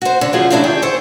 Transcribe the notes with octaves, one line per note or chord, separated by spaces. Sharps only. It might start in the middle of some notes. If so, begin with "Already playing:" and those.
F#4 C5
D3
C#3 F3 A3 F4 F#4 G#4
F#2 A2 F#3 D4 A4 E5
D#3 G4 G#4
A4 C5 C#5